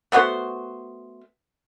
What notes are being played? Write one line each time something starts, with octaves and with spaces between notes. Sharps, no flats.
A3 B3 F#4 C5